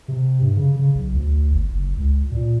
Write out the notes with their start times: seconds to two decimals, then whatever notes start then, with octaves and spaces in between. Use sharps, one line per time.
0.08 C3
0.41 G2
0.56 C#3
0.76 C#3
0.95 B1
1.14 D2
1.52 G1
1.72 F#1
1.96 C#2
2.31 A#2